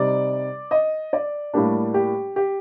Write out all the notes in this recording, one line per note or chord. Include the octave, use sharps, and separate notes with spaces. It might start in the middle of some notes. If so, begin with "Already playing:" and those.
Already playing: C3 G3 C4 D#4 D5
D#5
D5
A2 G3 A#3 D4 G4
G4
G4